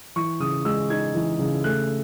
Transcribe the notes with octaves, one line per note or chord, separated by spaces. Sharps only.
E3 C#6
C#3 D#6
G#3 E6
D#4 G#6
E3
C#3
A3 F#6